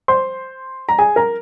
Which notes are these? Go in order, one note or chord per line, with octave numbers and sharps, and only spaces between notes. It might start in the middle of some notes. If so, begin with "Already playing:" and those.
C5 C6
A#5
G#4 G#5
A#4 A#5